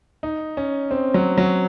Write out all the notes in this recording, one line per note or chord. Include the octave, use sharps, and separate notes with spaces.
D#4
C#4
C4
F#3
F#3